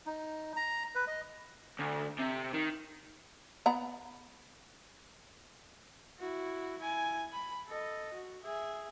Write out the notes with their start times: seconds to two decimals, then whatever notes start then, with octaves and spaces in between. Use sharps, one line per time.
0.06 D#4
0.56 A#5
0.95 B4
1.07 D#5
1.79 D2
2.19 C3
2.53 D#3
3.66 B3 F#5 A#5
6.19 E4 F#4
6.79 E4 G#5
7.33 B5
7.68 A4 D#5
8.14 F#4
8.44 G#4 E5